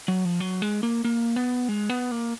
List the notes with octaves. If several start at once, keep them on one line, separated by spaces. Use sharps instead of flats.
F#3
F3
F#3
G#3
A#3
A#3
B3
G#3
B3
A#3